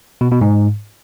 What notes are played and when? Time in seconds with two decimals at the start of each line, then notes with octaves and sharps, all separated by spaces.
0.21 B2
0.31 B2
0.41 G#2